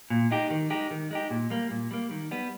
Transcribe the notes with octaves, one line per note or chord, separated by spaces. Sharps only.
A#2
G#3 D#4 G4
D#3
G#3 D#4 G4
D#3
G#3 D#4 G4
A#2
G3 A#3
A#2
G3 A#3
D#3
G3 B3